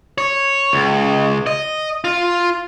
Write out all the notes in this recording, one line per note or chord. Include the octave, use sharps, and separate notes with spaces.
C#5
C#2
D#5
F4